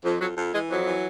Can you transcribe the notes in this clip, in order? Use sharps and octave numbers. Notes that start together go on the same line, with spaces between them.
F2
F2 F#3
F2
E3 G#3
F2 F#3
E3